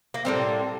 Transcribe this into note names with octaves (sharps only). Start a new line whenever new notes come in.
A#3
A2 G3 A#3 C4